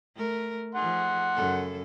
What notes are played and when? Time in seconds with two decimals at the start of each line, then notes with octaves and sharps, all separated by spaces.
0.15 A3 A#4
0.75 F3 G#4 F#5 C6
1.35 F#2 C#3 A4